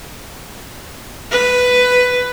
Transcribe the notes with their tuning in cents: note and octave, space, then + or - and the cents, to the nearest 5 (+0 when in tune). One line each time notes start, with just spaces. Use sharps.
B4 +5